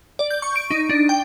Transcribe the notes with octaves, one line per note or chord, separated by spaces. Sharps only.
D5
G6
C#6
D7
D#4
D4
G5